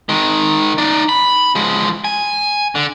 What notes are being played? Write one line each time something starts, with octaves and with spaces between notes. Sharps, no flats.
D#3 G#3
D#4 D5
B5
F3 G#3
G#5
D3